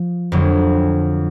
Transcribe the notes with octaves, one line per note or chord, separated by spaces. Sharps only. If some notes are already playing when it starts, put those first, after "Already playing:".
Already playing: F3
F2 D3 F#3